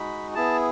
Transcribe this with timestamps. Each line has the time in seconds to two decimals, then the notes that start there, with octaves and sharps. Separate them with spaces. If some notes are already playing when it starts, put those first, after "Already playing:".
Already playing: G#3 D#4 F#4 B5
0.35 B3 E4 G#4 A5